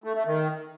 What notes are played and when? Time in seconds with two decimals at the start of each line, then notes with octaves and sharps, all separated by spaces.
0.04 A3
0.15 A3
0.26 D#3